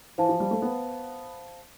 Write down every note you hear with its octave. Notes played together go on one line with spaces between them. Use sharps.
E3 C5 F5 A5
F3
G3
A3
B3